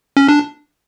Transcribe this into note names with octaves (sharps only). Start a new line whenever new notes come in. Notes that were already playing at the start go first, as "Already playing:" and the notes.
C#4
D4